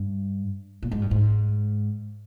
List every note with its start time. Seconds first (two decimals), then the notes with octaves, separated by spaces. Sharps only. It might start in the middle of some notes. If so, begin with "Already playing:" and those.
Already playing: G2
0.83 A#2
0.91 G#2
1.02 G2
1.11 G#2